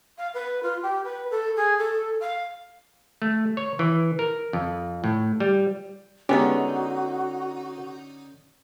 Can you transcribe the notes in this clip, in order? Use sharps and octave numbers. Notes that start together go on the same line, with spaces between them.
F5
B4
F4
G4
B4
A4
G#4
A4
F5
A3
C#5
E3
A#4
F2
A2
G3
D3 G#3 B3 C#4 D#4 F#4 G4